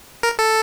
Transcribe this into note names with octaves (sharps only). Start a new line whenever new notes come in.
A#4
A4